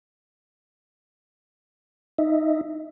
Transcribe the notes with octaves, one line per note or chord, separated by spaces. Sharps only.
D#4 D#5 E5